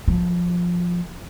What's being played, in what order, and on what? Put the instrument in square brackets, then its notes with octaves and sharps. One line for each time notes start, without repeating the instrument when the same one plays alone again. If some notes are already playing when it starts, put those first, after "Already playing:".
[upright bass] F3